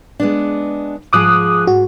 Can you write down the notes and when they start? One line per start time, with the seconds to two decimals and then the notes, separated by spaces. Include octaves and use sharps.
0.20 G#3 B3 D4
1.13 G#2 F3 G#4 D6 D#6 F#6
1.67 G#2 F#4